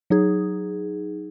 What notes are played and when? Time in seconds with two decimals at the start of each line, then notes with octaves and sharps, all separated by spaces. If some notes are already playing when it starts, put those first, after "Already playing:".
0.10 F#3 D#4 G#4